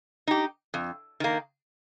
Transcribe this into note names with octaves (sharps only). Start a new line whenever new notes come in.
D#4 G4
F2
D#3 A#3